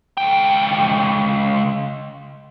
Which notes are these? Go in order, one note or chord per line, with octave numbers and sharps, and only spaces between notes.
C#2 G5